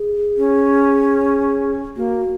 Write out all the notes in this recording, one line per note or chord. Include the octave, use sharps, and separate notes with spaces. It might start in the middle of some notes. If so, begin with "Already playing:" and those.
Already playing: G#4
C#4
A#3 F#4